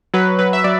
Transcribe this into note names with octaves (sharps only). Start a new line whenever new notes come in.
F#3 B4
F#3 B4
E5
F#3 D5